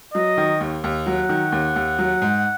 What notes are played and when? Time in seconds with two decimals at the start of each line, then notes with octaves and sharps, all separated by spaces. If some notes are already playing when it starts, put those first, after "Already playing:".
0.14 F#3 D#5
0.37 D#3
0.60 D#2
0.84 D#2
1.06 F#3 F#5
1.29 D#3
1.52 D#2
1.76 D#2
1.99 F#3
2.22 G#2